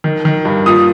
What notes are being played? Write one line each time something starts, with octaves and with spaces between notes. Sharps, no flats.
D#3
D#3
G2
A#2 D#6